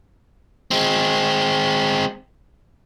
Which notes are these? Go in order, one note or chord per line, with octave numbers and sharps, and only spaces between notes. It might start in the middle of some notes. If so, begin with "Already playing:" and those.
G#3 C4